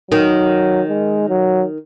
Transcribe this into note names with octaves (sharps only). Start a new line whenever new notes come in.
D#3 F#3
G#3
F#3